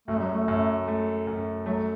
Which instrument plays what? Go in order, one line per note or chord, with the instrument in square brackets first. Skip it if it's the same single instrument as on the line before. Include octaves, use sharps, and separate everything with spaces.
[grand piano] F#2 [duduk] A3
[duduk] F#3
A3
[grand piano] F#2
A3
F#2
[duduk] F#3 [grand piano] A3